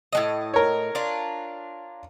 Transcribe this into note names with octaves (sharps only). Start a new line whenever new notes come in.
A2 G#3 D#5
A#4 C#5
D4 F4